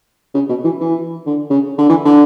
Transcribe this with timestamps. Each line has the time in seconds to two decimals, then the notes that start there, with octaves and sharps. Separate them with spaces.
0.34 C#3
0.49 B2
0.64 E3
0.81 E3
1.26 D3
1.50 C#3
1.78 D3
1.89 E3
2.05 D3